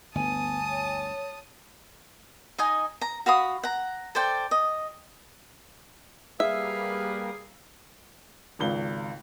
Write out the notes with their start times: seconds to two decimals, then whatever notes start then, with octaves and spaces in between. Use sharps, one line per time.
0.15 G1 D2 B3 G#5 A5 D#6
0.70 C#5
2.58 D#4 D#5 G#5
3.01 A#5
3.26 F#4 F5 B5 D#6
3.63 F#5 A#5
4.15 A4 C5 D5 G5
4.51 D#5
6.40 G3 A#3 G#4 B4 E5 F5
8.59 G#1 C#2 G7